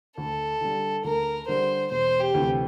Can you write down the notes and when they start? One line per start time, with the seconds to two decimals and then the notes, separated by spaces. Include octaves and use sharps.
0.18 D2 A4
0.61 D3 G3
1.04 D2 A#4
1.48 D3 G3 C5
1.91 E1 C5
2.20 G4
2.34 D2 C3 E3